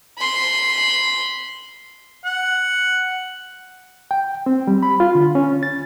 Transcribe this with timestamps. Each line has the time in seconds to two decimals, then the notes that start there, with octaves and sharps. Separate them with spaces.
0.18 B5 C6
2.25 F#5
4.11 G5
4.46 C4
4.67 G3
4.83 B5
5.00 F4
5.15 D3
5.35 C#4
5.63 A6